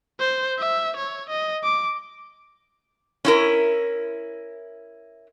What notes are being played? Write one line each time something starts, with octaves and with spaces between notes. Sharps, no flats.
C5
E5
C#5
D#5
D6
C#4 E4 A#4